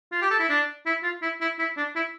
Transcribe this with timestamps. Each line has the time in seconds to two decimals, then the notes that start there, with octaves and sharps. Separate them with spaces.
0.12 F4
0.22 G4
0.31 A4
0.39 E4
0.49 D4
0.86 E4
1.03 F4
1.22 E4
1.41 E4
1.59 E4
1.77 D4
1.96 E4